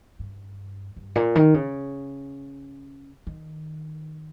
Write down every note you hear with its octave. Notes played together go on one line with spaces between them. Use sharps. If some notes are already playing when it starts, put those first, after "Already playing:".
G2
G2
A#2
D#3
C#3
D#3